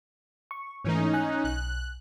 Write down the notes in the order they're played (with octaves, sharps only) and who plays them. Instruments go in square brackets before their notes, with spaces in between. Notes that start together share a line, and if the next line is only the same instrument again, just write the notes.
[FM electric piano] C#6
[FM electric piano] G#2 E3 A3 [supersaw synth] C#4 D#4
[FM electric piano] G#5 F#6
[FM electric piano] B1 [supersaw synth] F#6